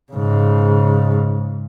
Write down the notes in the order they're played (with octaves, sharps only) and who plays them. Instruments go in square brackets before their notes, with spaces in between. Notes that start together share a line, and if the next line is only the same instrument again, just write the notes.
[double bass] G#2 C#3